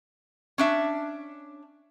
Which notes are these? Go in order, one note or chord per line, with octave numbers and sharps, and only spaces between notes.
C#4 D4 E5